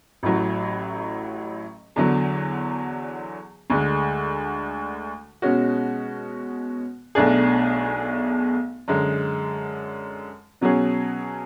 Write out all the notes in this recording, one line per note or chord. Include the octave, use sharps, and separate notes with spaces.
A1 A2 F#3
E2 D3 F#3
D2 D3 G#3
B2 G#3 C#4 F#4
B1 B2 A3 D4 G#4
F#2 D3 G#3
B2 F#3 C#4 G#4